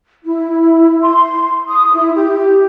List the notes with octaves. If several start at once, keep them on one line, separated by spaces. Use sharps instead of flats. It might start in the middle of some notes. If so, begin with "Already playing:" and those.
E4
C6
D#6
E4
G4